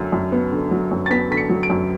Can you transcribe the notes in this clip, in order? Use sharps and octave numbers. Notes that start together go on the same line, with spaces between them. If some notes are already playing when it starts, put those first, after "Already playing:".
Already playing: F#2 D3 F#3
F#2
B3
D3
F#3
F#2
A6
B3 B6
D3 B6
C#7
F#3
D7
F#2